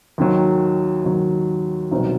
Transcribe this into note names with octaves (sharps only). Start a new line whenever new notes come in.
D#2 D#3 F#3
D#2 D#3 F#3
C2 B2 F#3 C4 D#4